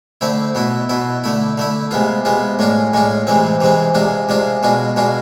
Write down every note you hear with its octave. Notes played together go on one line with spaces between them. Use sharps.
D3 A3 C4 E4
B2 B3 E4
B2 B3 E4
D3 A3 E4
D3 A3 E4
C3 G#3 B3 F4
C3 G#3 B3 F4
A2 G#3 D4 F4
A2 G#3 D4 F4
C3 E3 G#3 C4
C3 E3 G#3 C4
C3 G#3 D4 F4
C3 G#3 D4 F4
B2 G#3 D4 F4
B2 G#3 D4 F4